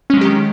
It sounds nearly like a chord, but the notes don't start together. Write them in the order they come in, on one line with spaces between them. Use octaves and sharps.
C#4 G#3 F#3 G4 D#3